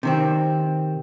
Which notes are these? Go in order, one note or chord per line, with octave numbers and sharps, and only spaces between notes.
C3 D#3 C4